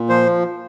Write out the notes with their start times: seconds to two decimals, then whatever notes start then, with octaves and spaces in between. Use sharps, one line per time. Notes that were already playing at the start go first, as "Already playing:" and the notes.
Already playing: A#2
0.09 F3 C5